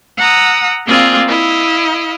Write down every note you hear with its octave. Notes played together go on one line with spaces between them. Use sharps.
F#5 A#5 D#6 E6
A#3 C4 F4 G#4 D5
E4 D#5 F5